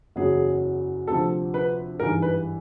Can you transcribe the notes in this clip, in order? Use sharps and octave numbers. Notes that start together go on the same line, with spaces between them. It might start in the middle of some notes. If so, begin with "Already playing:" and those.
F#1 E2 C#3 F#3 G#4
D2 C3 F3 A4
B4
G#1 G2 E3 A#4
B4